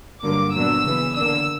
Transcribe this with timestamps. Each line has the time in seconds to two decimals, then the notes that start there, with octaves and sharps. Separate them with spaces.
0.24 G2 D3 F#3 A#3 D6
0.55 A#2 F#3 B3 D4 E6
0.85 C#3 E3 B3
1.17 D3 A#3 D4 E6